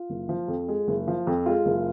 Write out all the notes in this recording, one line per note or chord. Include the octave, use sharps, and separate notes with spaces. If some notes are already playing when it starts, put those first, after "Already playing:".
Already playing: F4
F#1
F3
F2
G#3
F#1
F3
F2
G#3 F4
F#1